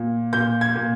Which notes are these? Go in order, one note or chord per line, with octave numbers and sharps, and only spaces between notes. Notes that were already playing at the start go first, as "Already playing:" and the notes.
Already playing: A#2
A#2 G6
G#6
A#2